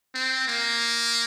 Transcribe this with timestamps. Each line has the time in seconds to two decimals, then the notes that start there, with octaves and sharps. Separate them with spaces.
0.15 C4
0.48 A#3